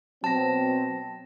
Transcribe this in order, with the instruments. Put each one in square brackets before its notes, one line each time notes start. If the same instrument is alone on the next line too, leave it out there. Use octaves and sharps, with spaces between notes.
[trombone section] B2 F#3 C4 [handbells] A5 A#6